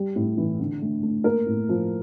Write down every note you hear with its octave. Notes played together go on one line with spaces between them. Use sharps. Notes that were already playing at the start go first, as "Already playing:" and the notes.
Already playing: G3
A2
E3
D3
A3
A3
A#3 A#4
A2
F3